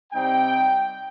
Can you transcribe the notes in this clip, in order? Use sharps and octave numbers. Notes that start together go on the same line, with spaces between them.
C3 G3 C4 D#4 G5